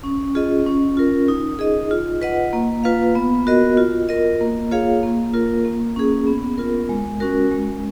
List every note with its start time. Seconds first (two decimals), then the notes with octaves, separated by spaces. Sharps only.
0.04 C#4
0.35 F4 G#4 D#5
0.66 C#4
0.97 F4 A#4
1.28 D#4
1.59 G#4 D#5
1.91 F4
2.22 B4 D#5 F#5
2.53 A#3
2.84 F4 B4 F5
3.15 B3
3.47 F#4 A#4 D#5
3.77 F4
4.09 A#4 D#5
4.41 A#3
4.71 F4 G#4 C#5 F5
5.03 A#3
5.34 F4 A#4
5.65 A#3
5.96 C#4 G#4
6.27 B3
6.58 F4 A#4
6.89 G#3
7.20 C#4 F#4 A#4
7.51 G#3